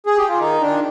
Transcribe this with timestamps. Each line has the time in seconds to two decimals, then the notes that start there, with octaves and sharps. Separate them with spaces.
0.06 G#4
0.18 G4
0.28 F4
0.39 D#3 D#4
0.61 D#3 D4